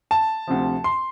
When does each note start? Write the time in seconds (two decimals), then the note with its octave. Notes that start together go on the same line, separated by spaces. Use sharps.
0.11 A5
0.47 D2 C3 F3
0.84 C6